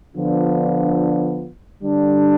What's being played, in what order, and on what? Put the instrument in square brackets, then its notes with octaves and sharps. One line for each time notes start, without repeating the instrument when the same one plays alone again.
[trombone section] D3 F3 B3 D4 F4
D3 G3 D4